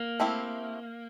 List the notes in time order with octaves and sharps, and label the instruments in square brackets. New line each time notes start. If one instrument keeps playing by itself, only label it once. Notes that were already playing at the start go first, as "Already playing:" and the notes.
Already playing: [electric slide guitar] A#3
[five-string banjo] A3 C4 E4 G4